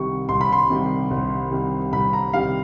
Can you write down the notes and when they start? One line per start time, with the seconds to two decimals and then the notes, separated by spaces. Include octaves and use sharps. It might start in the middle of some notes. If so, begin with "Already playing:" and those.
Already playing: C2 C3 D#3 G3 C#6
0.29 C2 C6
0.41 B5
0.53 C6
0.70 C3 D#3 G3
1.11 C2
1.51 C3 D#3 G3
1.93 C2 B5
2.13 A#5
2.33 C3 D#3 G3 F5